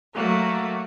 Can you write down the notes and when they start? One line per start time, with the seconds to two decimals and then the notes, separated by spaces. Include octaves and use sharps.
0.15 F#3 A3 A#3 F#4